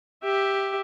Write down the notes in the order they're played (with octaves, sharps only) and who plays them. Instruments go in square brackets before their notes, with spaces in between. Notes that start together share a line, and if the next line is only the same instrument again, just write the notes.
[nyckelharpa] G4 E5